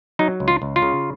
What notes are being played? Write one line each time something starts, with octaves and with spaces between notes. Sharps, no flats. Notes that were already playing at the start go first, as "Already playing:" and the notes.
F#3 D#4
C#2
F4
C#2
F4
C#3